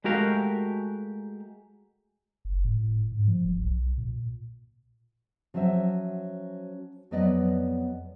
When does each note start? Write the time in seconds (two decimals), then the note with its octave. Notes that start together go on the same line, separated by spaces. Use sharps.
0.04 G#3 A3 F#4 G4 A#4 F5
2.45 F#1
2.65 A2
3.12 G#2
3.27 F3
3.45 E1
3.59 B1
3.98 A#2
5.54 F3 F#3 C#4 C5 E5
7.11 F2 F#3 B3 B4 D5 D#5